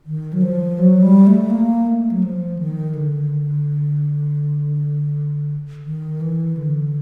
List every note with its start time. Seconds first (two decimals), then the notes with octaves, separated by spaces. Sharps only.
0.06 D#3
0.33 F#3
0.42 F3
0.79 F#3
1.02 G3
1.27 A3
1.50 A#3
1.87 A3
2.11 F#3
2.23 F3
2.59 D#3
2.95 D3
5.84 D#3
6.21 E3
6.57 D3